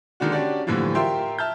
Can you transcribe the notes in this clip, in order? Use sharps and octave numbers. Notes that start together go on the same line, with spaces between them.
D3 D#3 G#3 D4 F#4
C#4 D4 F#4 G4 D5
F#2 A2 D3 E3 F3 G3
F4 G4 A#4 E5 G5 C6
E5 A5 F6 G6